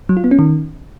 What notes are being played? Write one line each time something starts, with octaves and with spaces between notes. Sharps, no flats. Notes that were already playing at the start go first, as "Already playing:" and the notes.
F#3
F4
B3
C#4
D#3